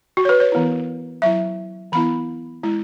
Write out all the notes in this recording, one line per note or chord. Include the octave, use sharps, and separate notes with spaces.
F#4
C#5
B4
C#5
E3 B3 E4
F#3 E4 E5
E3 B3 E4 B5
G#3 E4